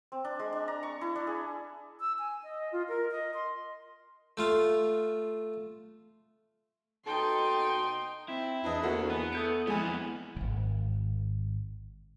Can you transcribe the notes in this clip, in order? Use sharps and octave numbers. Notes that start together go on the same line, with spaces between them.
C4
D4
G#3
D4
A#5
C#6
E4
D4
G#4
E6
G#5
D#5
F4
A#4
D#5
C6
A3 F4 F5
B2 D#4 A4 G5 C6
C4 E4
E2 E3 D4 B4 D#5
D2 A#3 F#4 A4
E3 B3
A3 D#6 G6 C#7
F2 E3 G#3 B3 G#5
D#1 G#1